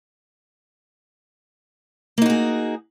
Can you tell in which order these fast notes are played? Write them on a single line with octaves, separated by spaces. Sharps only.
A#3 D#4 F#4 G#4